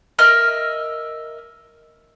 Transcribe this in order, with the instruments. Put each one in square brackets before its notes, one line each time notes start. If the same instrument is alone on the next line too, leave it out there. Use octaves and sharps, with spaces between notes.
[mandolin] A#4 D#5 E5 F6